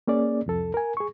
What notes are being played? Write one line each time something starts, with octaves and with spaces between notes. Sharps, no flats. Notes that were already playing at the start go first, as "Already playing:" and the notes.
A#3 C#4 G#4 D5
C2 F2 A4
A#4 G#5
G#4 C#6